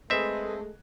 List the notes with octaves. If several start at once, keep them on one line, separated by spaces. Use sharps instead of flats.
G#3 A3 C4 G#4 B4 D#5 E5